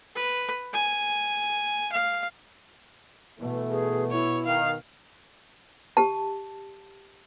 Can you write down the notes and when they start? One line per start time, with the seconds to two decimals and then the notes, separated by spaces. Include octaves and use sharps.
0.15 B4
0.73 G#5
1.92 F5
3.40 B2 E3 A3
3.70 G#4
4.12 E4 C#5
4.46 D#3 F5
5.97 G4 A5